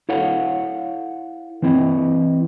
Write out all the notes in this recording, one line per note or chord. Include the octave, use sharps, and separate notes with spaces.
E4 A4 C#5 F5 F#5
E3 C4 E4 D#5